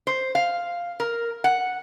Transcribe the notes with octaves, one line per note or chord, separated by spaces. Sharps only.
C5
F5
A#4
F#5